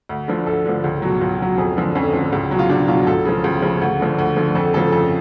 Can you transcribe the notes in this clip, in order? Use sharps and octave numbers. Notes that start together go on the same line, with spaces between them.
D2
D3 F3
D2 A4
D3 F3
C#2
B2 F#3
C#2
B2 F#3
F2 G#4
D3 F3
F2 C#4
D3 F3
C#2
B2 F#3
F4
C#2 D4
B2 F#3 F4
C#2 A4
C#3 F3
C#2
C#3 F3
D2
D3 F3
D2
D3 F3
F2 A4
C#3 F3 A4
F2 A4